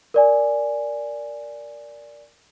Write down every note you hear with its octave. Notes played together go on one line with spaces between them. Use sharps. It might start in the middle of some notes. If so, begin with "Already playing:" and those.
A#4 D5 G#5